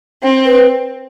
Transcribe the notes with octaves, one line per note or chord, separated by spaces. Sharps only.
C4
B4